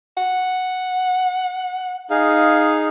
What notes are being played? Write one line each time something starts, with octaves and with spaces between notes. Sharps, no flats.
F#5
D#4 G#4 F5